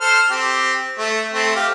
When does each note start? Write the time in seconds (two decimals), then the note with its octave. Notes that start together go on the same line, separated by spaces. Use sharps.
0.01 A4 C5 F6
0.30 C4 G4
0.98 A3
1.34 A3 C4
1.55 G4 F5